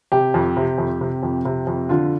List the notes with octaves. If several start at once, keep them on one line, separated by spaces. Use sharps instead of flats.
C3 G4
F2
C3
F2
C3
F2
C3
F2
D3 F4